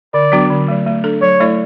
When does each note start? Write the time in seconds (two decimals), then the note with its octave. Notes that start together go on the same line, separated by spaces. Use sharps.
0.14 D3 D5
0.32 F#3 B3 D4 F#4
0.50 D3
0.68 F#3 A3
0.87 A3
1.04 D4 A4
1.22 F#3 C#5
1.40 A3 E4 A4 D5